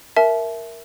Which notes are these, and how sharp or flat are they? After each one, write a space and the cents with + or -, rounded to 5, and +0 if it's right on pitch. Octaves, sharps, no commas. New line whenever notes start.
A#4 +0 E5 +0 A5 -35